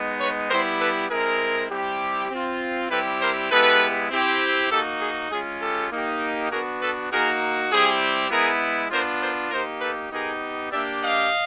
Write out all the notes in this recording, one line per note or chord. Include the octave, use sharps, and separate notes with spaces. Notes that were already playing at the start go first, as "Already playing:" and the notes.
Already playing: G#3 B3 D#4
B4 C#5
G3 B3 E4 G4 A#4 C5
A4 B4
G#3 C4 E4 G#4 A#4
G3 C4 E4 G4
C4 F4
G3 C4 E4 G4 A4 B4
A#4 C5
G#3 B3 E4 G4 A4 B4
C4 E4 G4
A#3 D#4 F#4 G4 A4
G#4
G#3 C#4 F4 G#4
G4 A4
A#3 D#4 G4
B3 D4 F#4 G#4 A#4
A4 B4
A#3 D#4 F#4 G#4 A#4
G3 C4 E4 G4 G#4
G#3 B3 E4 G#4 A#4
B3 D4 F4 A#4 C5
A#4 C5
A#3 D#4 G4 A#4 C5
A4 B4
B3 D#4 G4 G#4 A#4
A#3 D4 G4 D5 E5
D#5 F5